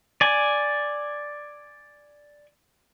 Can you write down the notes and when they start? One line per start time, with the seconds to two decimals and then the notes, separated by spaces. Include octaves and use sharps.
0.21 D5 G#5